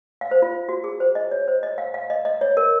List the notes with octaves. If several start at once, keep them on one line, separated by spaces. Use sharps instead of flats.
F5
C5
F4
F#4
G#4
C5
D#5
C#5
C5
D#5
F5
F5
D#5
D#5
C#5
A#4